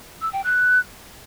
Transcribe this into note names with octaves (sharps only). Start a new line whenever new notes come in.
E6
G5
F#6